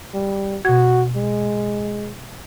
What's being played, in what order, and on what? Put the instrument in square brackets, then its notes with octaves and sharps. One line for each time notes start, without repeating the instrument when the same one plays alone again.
[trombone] G3
[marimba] B2 G#6 [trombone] F#4
[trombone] G#3